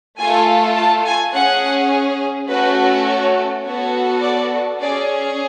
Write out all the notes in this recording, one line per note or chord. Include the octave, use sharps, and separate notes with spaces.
A3 F4 A4 G#5
A5
G#5
C#4 G#4 F#5
A3 C#4 F#4 A4 B4
C#5
B3 F#4 A4 C#5
D5
C#4 G#4 D5